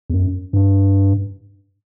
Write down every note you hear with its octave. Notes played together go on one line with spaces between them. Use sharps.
E2
F#2
G2